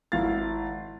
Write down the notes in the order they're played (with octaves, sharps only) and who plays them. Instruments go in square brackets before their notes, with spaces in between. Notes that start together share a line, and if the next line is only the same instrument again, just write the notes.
[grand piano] G#1 E4 F5 A6